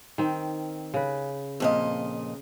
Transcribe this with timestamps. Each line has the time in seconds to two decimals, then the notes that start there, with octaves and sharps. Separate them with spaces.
0.18 D#3 C4
0.94 C#3 B4
1.60 F2 A#2 D#5